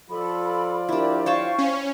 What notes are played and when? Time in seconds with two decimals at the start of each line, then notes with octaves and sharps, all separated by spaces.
0.10 F3 F4 A4 D5 B5
0.89 D4 E4 G4 A#4
1.26 C5 C#5 F5 G5 A5 C#6
1.58 C#4